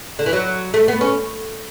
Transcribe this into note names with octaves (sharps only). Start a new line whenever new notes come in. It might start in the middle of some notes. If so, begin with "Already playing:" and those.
D3
E3
F#3
A3
B3
C#4